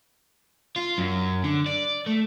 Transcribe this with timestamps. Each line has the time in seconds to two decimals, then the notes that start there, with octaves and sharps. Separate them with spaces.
0.76 F4
0.98 F#2
1.44 D3
1.66 D5
2.07 A3